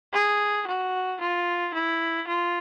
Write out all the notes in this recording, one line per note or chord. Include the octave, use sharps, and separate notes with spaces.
G#4
F#4
F4
E4
F4